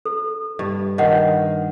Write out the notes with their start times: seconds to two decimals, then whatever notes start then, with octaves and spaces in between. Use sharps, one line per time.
0.05 A4
0.59 G2
0.98 D#3 D#5 F#5